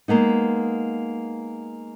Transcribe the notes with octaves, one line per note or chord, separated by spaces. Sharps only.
G#3 A#3 B3 D#4